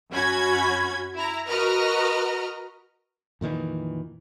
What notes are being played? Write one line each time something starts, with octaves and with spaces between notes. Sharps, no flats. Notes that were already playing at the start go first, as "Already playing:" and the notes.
F#2 C#4 F#4 B5 G#6
E4 A#5
F#4 A#4 B4 D#5 A#5 F6
F2 A#2 D#3 E3